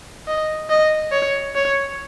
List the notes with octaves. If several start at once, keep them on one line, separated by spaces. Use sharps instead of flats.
D#5
D#5
C#5
C#5